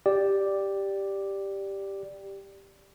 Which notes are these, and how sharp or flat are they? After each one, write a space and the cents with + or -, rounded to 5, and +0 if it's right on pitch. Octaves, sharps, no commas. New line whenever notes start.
G4 +0 D5 +0